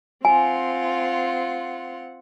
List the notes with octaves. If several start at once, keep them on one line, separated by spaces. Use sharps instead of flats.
C4 F4 F#5 G#5